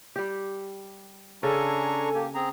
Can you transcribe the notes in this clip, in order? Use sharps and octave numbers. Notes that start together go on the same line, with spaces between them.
G3 G4
C#3 D4 A4 G#5 A#5 C#6
A#3 G4
C4 G#4 A#5